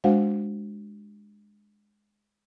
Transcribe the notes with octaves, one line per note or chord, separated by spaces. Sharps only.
G#3 D4 F#4 C5 F5 F#5